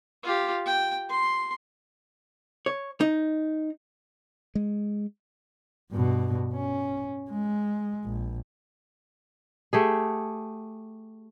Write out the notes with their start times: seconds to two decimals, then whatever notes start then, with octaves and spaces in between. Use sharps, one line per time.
0.23 F4 G4
0.66 G5
1.10 C6
2.66 C#5
3.01 D#4
4.55 G#3
5.92 G2 B2
6.54 C#4
7.30 G#3
8.05 A#1
9.73 A3 G4 G#4